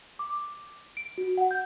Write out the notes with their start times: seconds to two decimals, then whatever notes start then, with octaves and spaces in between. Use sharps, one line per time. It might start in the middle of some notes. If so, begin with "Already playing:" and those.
0.19 D6
0.97 D7
1.18 F#4
1.37 F#5
1.51 G6